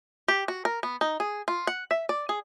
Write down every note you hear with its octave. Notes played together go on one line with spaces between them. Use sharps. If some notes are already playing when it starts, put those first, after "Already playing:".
G4
F#4
A#4
B3
D#4
G#4
F4
F#5
E5
D5
G#4